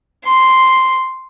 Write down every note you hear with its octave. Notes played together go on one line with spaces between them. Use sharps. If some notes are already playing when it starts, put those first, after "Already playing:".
C6